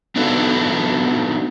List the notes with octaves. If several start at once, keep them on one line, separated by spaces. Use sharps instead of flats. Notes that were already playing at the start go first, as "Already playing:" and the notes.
B3 D4 D#4 F#4 A4 B4